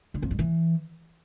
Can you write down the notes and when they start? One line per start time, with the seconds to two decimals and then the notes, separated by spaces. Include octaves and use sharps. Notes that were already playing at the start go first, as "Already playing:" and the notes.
0.14 D3
0.22 F2
0.31 G2
0.39 E3